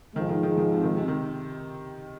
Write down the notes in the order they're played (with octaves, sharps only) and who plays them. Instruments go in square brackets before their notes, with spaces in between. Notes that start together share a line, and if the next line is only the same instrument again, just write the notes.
[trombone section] G#2 F3 G#3 [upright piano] D#3
[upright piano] D#3
D#3
D#3
C3
D#3
C3
D#3